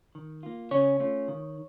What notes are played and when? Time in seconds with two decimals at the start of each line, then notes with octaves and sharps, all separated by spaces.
0.15 D#3
0.43 A#3 F4
0.71 C#3 C#4 C#5
1.00 A3 C#4 F4
1.28 D#3